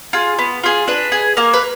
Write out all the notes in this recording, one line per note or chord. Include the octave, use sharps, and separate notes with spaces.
F4 G#4
B3
F4 G#4
D4 B4
G#4
A#3 A#4
B4